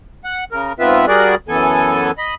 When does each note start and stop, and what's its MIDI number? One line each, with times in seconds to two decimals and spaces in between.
0.25 0.44 78
0.52 0.73 49
0.52 0.73 70
0.79 1.06 44
0.79 1.06 59
0.79 1.06 60
0.79 1.06 65
0.79 1.06 71
0.79 1.06 76
1.08 1.35 55
1.08 1.35 66
1.08 1.35 68
1.08 1.35 70
1.08 1.35 74
1.08 1.35 90
1.48 2.11 42
1.48 2.11 52
1.48 2.11 59
1.48 2.11 69
1.48 2.11 80
2.18 2.35 75
2.18 2.35 83